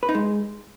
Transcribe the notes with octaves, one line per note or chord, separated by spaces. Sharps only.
B4
D#4
G#3